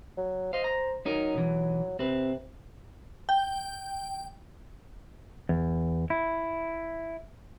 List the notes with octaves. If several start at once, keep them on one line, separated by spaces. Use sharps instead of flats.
F#3
C5 D#5 F5
A#5
F#3 C#4 D#4 A#4
B1 E3
C3 C4 B4
G5
E2
E4